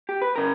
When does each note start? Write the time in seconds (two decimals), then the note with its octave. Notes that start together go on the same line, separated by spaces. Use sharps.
0.09 G4
0.22 B4
0.36 C#3 A#4